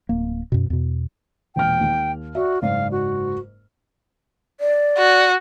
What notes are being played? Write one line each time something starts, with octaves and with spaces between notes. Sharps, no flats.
D1 A#3
F#2 B2
E2 B2
E1 A#2 G5 F6
D#2
F#4 D5 E5
F#1 G#2 D5 F5
F#4
D5
F#4